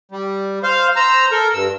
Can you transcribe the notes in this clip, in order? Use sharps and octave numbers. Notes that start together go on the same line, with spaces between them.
G3
C5 F5
C5 A#5 E6
A4 A#4
G2 E6